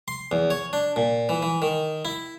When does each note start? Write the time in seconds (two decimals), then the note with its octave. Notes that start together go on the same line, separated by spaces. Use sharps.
0.08 C6
0.32 E2
0.50 C#5
0.73 D4
0.96 A#2
1.29 E3
1.42 E3
1.62 D#3
2.05 E4